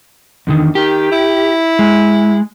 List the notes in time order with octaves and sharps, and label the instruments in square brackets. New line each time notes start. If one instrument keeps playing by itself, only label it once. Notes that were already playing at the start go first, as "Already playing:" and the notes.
[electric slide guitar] E2 D3 D#3
[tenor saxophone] D#3 [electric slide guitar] G4
[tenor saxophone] E4
[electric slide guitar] G#3